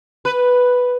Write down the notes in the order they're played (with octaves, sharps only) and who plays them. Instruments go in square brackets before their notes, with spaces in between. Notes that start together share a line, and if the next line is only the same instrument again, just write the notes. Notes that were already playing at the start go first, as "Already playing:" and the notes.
[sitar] B4